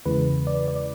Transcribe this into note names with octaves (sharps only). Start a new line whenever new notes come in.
E2 C#3 E3 G#3 B4
D5
D5